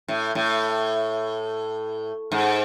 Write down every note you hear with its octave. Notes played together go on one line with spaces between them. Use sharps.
A2
A2
G#2